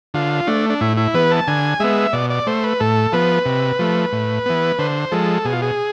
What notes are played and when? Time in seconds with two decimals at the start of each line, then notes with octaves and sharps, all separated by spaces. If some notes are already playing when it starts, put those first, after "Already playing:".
0.14 D3 F4
0.47 A3 D4
0.70 D4
0.81 A2 E4
0.97 E4
1.14 E3 B3 B4
1.31 A5
1.48 D3 G#5
1.80 G#3 B3 E5
2.13 B2 D5
2.30 D5
2.47 A3 C5
2.63 B4
2.80 A2 A4
3.12 F3 B3 B4
3.46 C3
3.79 F3 A3
4.12 A2
4.46 E3 B3
4.79 D3 C5
5.12 F3 G#3 A4
5.45 B2 G#4
5.53 F4
5.62 G#4